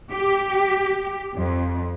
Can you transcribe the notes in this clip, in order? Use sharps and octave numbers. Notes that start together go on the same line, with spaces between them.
G4
F2